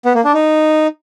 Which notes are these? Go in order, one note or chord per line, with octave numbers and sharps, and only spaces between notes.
B3
A#3
D4
D#4